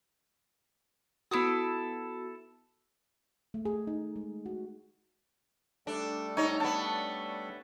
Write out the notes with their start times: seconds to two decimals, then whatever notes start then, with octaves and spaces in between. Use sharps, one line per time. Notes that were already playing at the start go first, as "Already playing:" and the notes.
1.31 B3 E4 F#4 A4 D#6
3.54 A3
3.65 G#4
3.87 D#4
4.16 G#3
4.46 F#4
5.87 G3 A3 D4 A4
6.37 G#2 D#4 C#5
6.60 B3 D4 A5